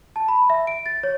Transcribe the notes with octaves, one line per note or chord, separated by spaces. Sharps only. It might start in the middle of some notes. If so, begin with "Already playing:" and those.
A5
B5
E5
D7
A6
C#5